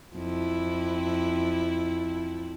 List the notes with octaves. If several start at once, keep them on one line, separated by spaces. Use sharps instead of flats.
F2 E4